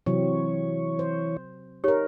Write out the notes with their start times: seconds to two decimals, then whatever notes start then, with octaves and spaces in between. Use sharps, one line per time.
0.06 C3 E3 F#3 C4 C#5
0.99 C5
1.84 D#4 G4 A#4 C#5